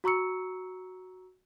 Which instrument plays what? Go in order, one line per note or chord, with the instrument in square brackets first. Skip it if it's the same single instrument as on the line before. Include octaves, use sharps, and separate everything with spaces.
[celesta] F#4 A#5 C#6 E6 C#7